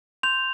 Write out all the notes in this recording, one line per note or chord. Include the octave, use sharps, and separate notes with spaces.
C6 G6 F7